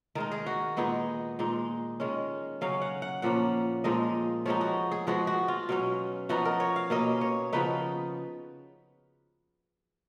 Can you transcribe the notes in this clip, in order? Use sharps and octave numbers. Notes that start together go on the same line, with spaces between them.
D#3 G#3 D#4 A#4
G#4
F#4
A#2 G#3 B3 D#4 G#4
A#2 G#3 D#4
D#3 G#3 C#4
C#3 F#3 C#4 F5
F#5
F#5
A#2 F3 A#3 C#4 F#5
A#2 F3 G#3 D#4 D#5
F3 G#3 B3 D#4 C#5
F#4
G#4
F3 G#3 B3 F#4
F#4
F4
B2 F#3 C#4
F3 B3 D#4 F#4
A#4
C#5
F5
B2 A#3 C#4 D#5
C#5
C#3 F3 B3 D#4 B4